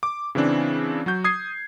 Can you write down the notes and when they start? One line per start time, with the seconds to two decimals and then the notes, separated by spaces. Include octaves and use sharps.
0.03 D6
0.35 C#3 E3 C4 D4
1.06 F#3 F#4 G6
1.24 D#6 G#6 C7